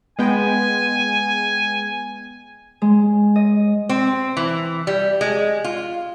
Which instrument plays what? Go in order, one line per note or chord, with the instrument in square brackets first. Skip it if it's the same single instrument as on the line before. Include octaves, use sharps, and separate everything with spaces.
[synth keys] G#3 B3 G5 [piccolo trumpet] G#5
[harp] G#3
D#5
[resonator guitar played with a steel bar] C4
E3
G3
G#3
F4